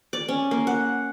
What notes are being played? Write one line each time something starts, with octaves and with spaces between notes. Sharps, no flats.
D5
C#4
A#3
F#5